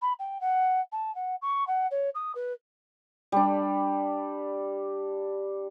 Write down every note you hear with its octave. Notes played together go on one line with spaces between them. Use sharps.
B5
G5
F#5
A5
F#5
C#6
F#5
C#5
D#6
B4
G3 D4